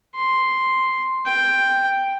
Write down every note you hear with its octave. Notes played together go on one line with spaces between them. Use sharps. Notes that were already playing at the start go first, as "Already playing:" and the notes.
C6
G5